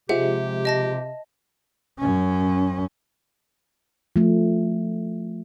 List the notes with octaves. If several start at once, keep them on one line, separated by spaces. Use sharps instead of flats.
C3 F3 G#3 G4 E5 F#5
D#5 A5 A#6
F#2 C#4
F3 A3